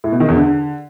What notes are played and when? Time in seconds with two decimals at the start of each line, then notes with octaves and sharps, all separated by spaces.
0.04 A2
0.12 B2
0.20 D#3
0.28 E2
0.37 D3